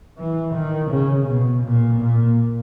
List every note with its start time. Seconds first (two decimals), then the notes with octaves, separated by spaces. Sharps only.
0.18 E3
0.54 D#3
0.91 C#3
1.28 B2
1.64 A#2
2.01 A#2